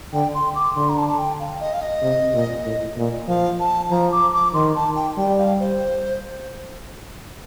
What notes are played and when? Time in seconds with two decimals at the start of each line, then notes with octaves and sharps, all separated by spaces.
0.13 D3 G5
0.35 C6
0.55 D6
0.76 D3 C6
0.89 A#5
0.97 A5
1.09 A5
1.18 G5
1.39 F5
1.60 D#5
1.73 F5
1.81 D#5
2.02 C3
2.34 A#2
2.65 A2
2.97 A#2
3.28 F3 F5
3.59 A5
3.91 F3 A#5
4.12 D6
4.33 D6
4.54 D#3 C6
4.75 A5
4.96 G5
5.17 G3 G5
5.38 F5
5.59 C5